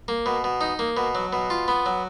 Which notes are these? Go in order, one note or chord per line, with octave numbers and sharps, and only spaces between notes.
A#3
B2
B2
D#4
A#3
B2
F#3
B2
F4
B3
F#3